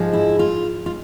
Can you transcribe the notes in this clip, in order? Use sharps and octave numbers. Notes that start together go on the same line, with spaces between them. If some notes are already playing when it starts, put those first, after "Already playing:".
Already playing: G#2 F3 G#3
E4
F4
F4